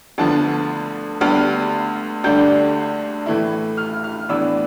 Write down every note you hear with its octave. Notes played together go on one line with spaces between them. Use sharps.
D2 D3 F3 B3 A5
D2 D3 G3 B3 F6
D2 D3 G3 D4 G6
A2 E3 A3 E4
F6
F6
A2 E3 B3 D4 E6